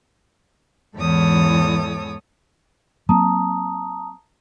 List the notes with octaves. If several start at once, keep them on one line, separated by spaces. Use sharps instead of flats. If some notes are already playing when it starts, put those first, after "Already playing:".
E2 G#2 E3 A4 C#5 D#6
F#3 A#3 C4 A5 A#5 D#6